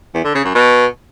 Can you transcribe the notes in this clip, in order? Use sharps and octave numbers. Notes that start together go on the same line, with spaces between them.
E2
D3
C#3
F#2
B2